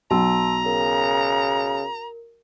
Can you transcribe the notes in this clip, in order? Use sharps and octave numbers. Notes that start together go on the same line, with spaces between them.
B1 A5 A#5 C6 E6
C#3 A#4